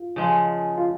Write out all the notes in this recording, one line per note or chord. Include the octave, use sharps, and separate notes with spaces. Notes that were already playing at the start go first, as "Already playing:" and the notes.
Already playing: F4
C#3 F3 G#3
F4